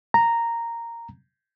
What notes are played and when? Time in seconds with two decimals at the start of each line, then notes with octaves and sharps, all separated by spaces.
0.14 A#5